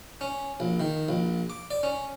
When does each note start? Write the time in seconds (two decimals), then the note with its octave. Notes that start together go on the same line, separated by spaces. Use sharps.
0.21 C#4
0.60 A#1
0.80 D#3
1.09 A#1
1.50 D6
1.71 D5
1.83 C#4